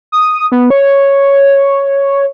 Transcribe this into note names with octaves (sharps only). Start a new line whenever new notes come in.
D#6
B3
C#5